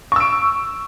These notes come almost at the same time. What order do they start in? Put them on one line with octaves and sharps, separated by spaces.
C#6 E6 D7